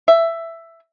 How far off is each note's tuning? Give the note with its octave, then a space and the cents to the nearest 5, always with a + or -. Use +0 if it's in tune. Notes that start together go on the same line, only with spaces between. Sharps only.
E5 +10